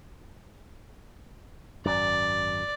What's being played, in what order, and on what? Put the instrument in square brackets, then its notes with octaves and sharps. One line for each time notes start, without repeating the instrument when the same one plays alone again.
[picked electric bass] G#1 F#2 [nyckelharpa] D5